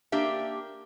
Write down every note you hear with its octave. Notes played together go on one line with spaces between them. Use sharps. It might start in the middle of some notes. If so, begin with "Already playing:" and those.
A#3 D4 G4 E5